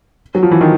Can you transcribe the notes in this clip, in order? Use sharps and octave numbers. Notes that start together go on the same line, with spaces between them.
F#3
F3
E3
D#3